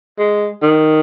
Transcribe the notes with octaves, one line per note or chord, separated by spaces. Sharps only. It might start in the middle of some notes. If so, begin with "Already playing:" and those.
G#3
D#3